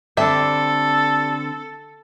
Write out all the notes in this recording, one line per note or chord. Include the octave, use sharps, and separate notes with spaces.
D3 G3 C4 D4 A4 E5 A5